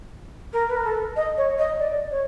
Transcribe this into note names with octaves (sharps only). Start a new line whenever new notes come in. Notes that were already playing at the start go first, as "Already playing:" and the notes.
A#4
B4
A#4
A4
D#5
C#5
D#5
D5
C#5